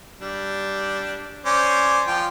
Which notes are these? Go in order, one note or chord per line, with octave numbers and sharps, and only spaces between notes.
G3 D4
C#4 C5 D5
F3 F4 G5